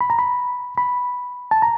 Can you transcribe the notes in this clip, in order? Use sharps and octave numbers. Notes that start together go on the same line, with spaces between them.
B5
A#5
B5
B5
A5
A#5